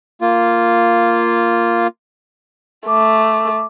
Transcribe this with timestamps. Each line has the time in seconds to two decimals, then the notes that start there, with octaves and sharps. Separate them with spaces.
0.21 A#3 F4
2.87 A3 D6